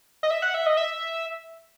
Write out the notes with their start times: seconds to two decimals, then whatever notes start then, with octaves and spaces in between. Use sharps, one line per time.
0.23 D#5
0.30 E5
0.42 F#5
0.54 E5
0.66 D#5
0.77 E5